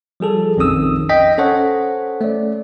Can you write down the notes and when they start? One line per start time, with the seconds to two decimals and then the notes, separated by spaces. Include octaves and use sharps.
0.20 F3 G3 G#4 A4
0.57 A#1 F2 D#3 C#4 D#6 E6
1.09 D#5 G5 B6
1.38 C#4 A4 C5 C#5 F#5
2.21 A3 D5